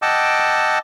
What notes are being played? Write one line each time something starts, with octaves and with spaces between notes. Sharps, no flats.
D#5 F#5 G5 A5 D6 E6